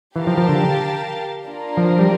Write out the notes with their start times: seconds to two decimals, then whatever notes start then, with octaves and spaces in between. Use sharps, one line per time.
0.16 E3 G4 A#4 F5 A5
0.27 F3
0.37 F3
0.49 D3
1.46 A#3 D4 F4 A#4
1.77 F3
1.99 G3